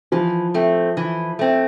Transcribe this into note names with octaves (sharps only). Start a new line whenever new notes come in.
E3 F3
A3 C4
E3
A3 C4